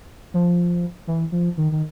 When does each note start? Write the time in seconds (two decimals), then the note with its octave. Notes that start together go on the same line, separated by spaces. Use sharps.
0.34 F3
1.07 E3
1.32 F3
1.57 D#3
1.72 D#3